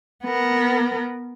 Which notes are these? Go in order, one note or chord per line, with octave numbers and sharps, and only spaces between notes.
B3 A#4